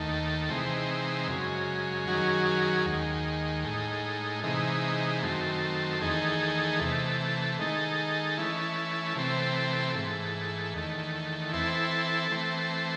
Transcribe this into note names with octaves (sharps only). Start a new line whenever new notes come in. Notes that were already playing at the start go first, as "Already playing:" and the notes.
Already playing: D#2 D#3 A3
C3 E3 G#3 C4 D#4
F#2 C#3 G#3
F#2 D#3 F#3 C#4 G#4
D#2 D#3 G#3
A2 G#3 D#4
C3 E3 G#3 D#4
F#2 D#3 A3 C4
E2 D#3 A3 D#4 G#4
C3 E3 A3
D#3 G#3 D#4 A4
E3 A3 C#4 E4
C3 E3 A3 C4
G#2 E3 A3
E2 D#3 A3
E3 C4 E4 A4
E3 A3 C4